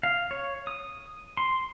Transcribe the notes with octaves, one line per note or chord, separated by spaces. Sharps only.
F5
C#5
D#6
C6